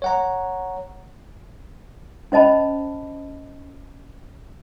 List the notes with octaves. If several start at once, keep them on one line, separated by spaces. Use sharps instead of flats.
C#5 F#5 A#5
C#4 C5 D#5 A5 B5